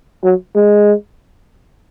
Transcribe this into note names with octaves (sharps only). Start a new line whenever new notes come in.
F#3
G#3